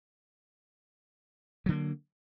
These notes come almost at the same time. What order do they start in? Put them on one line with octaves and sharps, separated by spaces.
F#3 D3 A#3